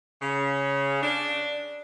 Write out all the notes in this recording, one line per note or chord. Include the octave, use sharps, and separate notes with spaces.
C#3
D4